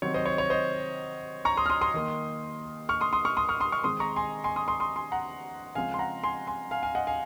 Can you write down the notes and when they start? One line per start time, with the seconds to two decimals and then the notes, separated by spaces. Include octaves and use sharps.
0.02 C3 D#3 F#3 C4 C#5
0.14 C5 D#5
0.26 C#5
0.38 C#5
0.50 C5 D#5
1.45 A#5 C#6
1.57 C6 D#6
1.66 F6
1.70 C6 D#6
1.81 C6 D#6
1.94 D#3 A#3
2.89 C#6 F6
3.01 C6 D#6
3.13 C6 D#6
3.25 C#6 F6
3.37 C6 D#6
3.49 C#6 F6
3.60 C6 D#6
3.72 C#6 F6
3.84 D#3 G#3 C4 C6 D#6
4.00 A#5 C#6
4.16 G#5 C6
4.44 G#5 C6
4.56 C6 D#6
4.68 C6 D#6
4.80 C6 D#6
4.96 G#5 C6
5.12 F#5 A#5
5.75 C#3 F3 G#3 C4 F5 G#5
5.94 C6
5.99 F#5 A#5
6.24 G#5 C6
6.47 G#5 C6
6.71 F5 G#5
6.83 F5 G#5
6.95 D#5 F#5
7.07 F5 G#5